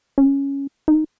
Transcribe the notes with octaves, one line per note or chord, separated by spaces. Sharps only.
C#4
D#4